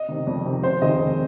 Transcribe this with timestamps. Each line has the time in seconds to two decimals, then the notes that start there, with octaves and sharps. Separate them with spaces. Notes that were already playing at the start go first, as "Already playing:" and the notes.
Already playing: D#5
0.08 C3 D#3
0.27 F2
0.45 C3 D#3
0.62 F1 C5
0.82 D#2 D#3 G#3 C4 D#5
0.99 F1